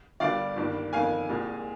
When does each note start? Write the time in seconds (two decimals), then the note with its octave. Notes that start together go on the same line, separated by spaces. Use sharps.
0.20 G1 G2 D3 G3 D4 D5 F5
0.56 G1 G2 D#3 A#3
0.93 G1 F2 D#3 A#3 F5 G#5
1.29 C2 A#2 G#3